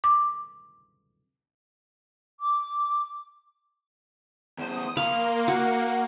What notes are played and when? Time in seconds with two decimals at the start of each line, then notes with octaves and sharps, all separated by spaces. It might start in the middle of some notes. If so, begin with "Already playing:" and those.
0.04 D6
2.40 D6
4.58 E2 C5 D#6
4.97 A#3 F5 B5 C6
5.48 F#4 F#5